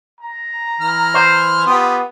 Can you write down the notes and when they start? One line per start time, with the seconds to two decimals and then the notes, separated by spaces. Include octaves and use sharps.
0.21 A#5
0.81 E3 F6
1.14 C5
1.66 B3 F4 G4 D#6